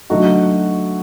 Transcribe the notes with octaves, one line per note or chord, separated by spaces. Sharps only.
D3 F#3 A3 D#4 F#4